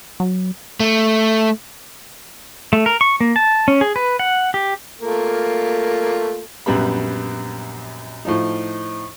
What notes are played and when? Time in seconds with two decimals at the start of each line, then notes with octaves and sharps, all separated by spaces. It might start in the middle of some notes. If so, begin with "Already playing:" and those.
0.20 F#3
0.80 A3
2.73 A3
2.86 A#4
3.01 C#6
3.21 A#3
3.36 A5
3.68 C#4
3.81 G#4
3.96 B4
4.19 F#5
4.54 G4
5.02 A3 A#3 F4
6.66 A#1 F#2 G3 B3 B5
8.25 A2 F3 D#4